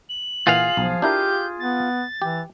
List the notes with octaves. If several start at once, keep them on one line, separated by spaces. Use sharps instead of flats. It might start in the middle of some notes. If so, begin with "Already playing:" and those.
F#7
A#2 E3 F4 G#4 F5 F#5
B1 F3
D4 E4 G4 A#4 G6
B3 A6
E3 G4